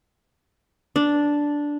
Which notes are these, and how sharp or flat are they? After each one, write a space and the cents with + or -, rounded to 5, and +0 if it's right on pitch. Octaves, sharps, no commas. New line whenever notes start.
D4 -5